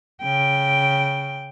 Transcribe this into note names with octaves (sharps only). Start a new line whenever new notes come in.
C#3 G5